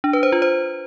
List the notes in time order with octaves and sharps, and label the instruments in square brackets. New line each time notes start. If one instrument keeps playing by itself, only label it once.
[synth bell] D4
B4
C5
F4
C5